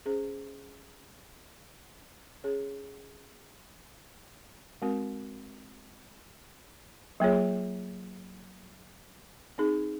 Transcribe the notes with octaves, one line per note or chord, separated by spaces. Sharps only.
C#4 G#4 C5
C#4 G#4 C#5
G#3 C4 F#4 A#4
F#3 A#3 F4 G#4 C#5
C4 D#4 G#4